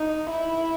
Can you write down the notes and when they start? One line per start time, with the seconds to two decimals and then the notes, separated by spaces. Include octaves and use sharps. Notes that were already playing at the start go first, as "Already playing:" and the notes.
Already playing: D#4
0.30 E4